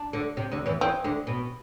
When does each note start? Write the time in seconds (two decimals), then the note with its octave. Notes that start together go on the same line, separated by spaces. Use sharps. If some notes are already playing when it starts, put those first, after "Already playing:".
Already playing: D4
0.13 D2 D3
0.37 C3
0.51 D2 D3
0.66 E2 E3
0.81 E2 E3 C4
1.04 D2 D3
1.27 B2